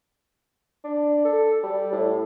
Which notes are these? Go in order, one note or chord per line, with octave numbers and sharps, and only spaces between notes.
D4
A4
G3
A2